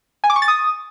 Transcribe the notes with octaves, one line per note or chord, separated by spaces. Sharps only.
G#5
D6
C#6
A6
D#6